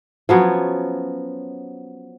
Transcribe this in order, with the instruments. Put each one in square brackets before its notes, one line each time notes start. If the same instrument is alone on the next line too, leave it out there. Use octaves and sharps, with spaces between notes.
[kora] F3 F#3 B3 C#4